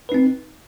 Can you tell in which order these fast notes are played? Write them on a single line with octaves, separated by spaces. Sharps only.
B4 D#4 C4